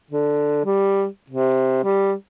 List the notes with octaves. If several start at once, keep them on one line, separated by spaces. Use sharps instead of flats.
D3
G3
C3
G3